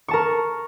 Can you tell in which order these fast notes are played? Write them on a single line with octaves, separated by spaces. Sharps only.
C#6 A5 A#4